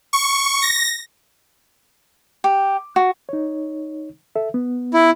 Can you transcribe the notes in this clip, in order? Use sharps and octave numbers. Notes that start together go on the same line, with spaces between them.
C#6
A#6
G4
F#4
D#4 C#5
A4 E5
B3
E4